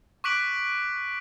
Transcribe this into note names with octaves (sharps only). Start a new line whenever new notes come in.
C#6 D6 F#6 B6 D7 F#7